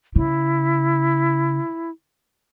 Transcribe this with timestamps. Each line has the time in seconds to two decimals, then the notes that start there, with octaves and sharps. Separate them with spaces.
0.16 C#3 E4